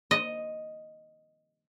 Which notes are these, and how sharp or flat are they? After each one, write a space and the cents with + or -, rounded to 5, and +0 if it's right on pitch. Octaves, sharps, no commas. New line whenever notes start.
D#5 +0